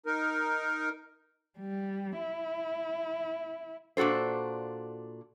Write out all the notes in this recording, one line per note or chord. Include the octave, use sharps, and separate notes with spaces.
D#4 A#4
G3
E4
A#2 D4 F#4 A4 C5